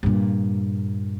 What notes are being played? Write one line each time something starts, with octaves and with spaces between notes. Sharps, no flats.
G2 A#2